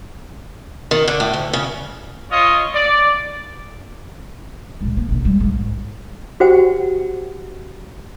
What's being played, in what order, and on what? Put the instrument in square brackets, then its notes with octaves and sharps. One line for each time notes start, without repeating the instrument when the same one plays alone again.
[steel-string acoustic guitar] D#3
D3
A2
D2
C#3
[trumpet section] F4 C#5 D#5
D5
[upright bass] C#2 A#2
A#3
A#1 B2
G3 G#3
B1 G#2
[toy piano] F#4 G4 C5 F#5 G5